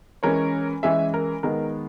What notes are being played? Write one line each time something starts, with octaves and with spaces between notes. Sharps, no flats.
E3 G#3 C#4 A#4 C#5
E3 G#3 C#4 E5 G#5
A#4
D#3 G#3 B3 A#4